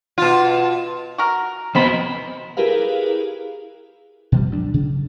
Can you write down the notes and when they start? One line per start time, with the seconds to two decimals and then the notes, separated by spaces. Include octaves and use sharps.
0.18 B2 F4
1.18 F#4 A#4
1.75 C3 F3 F#3 B3 C5 D#5 A#5 B5
2.57 E4 G4 G#4 A#4 B4 F5
4.32 B2 F3 G3
4.51 D2 F#3 D4
4.74 C#3